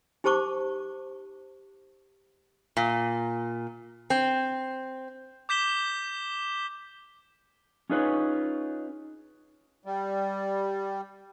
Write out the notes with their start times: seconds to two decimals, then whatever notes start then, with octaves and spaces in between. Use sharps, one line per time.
0.24 D#4 G4 C5 A5 C#6 D6
2.77 A#2
4.10 C4
5.49 D6 G6 B6 E7 G7
7.90 C#4 D#4 F4 G#4 B4 C#5
9.86 G3